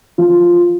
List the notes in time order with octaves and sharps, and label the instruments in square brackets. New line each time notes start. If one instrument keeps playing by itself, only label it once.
[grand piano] F3